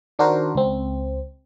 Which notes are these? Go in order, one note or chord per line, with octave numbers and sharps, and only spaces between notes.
D#3 D4 F#4 A#4 C5
C#2 C4